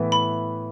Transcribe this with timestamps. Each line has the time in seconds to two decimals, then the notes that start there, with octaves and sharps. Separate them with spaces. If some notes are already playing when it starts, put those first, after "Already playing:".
Already playing: A2 E3 B3 E4
0.12 B5